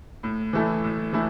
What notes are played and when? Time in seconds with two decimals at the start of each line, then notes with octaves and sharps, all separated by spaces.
0.23 A2
0.53 E3 A3 E4 A4
0.84 A2
1.13 E3 A3 E4